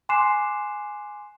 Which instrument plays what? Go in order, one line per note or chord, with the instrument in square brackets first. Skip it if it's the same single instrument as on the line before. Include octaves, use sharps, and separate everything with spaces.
[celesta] G#5 C6 D6 F#6 C7 E7